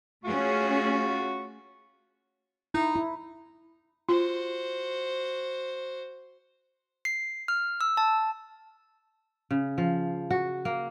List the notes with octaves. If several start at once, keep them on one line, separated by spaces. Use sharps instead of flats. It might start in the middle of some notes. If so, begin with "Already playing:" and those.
A3 C#4 F4 F#4 G#4 C#6
D#4 E4
E4
F4 F#4 C5
C7
F6
E6
A5
C#3
F3
F#4
A#3